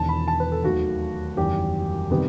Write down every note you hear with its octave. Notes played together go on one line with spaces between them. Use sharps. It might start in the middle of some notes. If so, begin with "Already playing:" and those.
Already playing: E1 E2 D#3 A5
B5
A5
B4
A4
D#2 D#3 F#3 A3 F#4
F#1 E2 D#3 G3 G4
C3 D#3 G3 B3